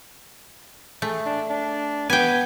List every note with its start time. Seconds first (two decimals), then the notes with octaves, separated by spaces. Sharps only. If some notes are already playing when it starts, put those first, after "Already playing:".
1.02 A3 G#4
1.26 D4
1.50 D4
2.10 B3 G5 G#5